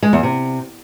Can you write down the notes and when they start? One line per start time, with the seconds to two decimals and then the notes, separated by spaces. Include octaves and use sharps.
0.03 G#3
0.13 E2
0.23 C3